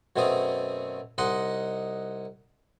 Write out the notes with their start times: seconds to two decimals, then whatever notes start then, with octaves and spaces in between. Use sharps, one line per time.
0.16 F#2 B2 A3 C4 G#4 D#6
1.18 C2 D#4 D#5 F#5 C6